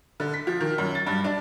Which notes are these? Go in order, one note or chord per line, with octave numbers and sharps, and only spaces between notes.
D3
B6
F3
D#3
F#2
A6
G2
D4